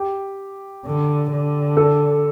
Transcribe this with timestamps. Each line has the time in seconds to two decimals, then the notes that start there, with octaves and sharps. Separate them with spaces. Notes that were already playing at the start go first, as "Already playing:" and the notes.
Already playing: G4
0.85 D3
1.31 D3
1.77 A4